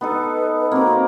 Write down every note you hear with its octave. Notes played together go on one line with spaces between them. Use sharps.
B3 D#4 A4 B4
A#3 C4 F#4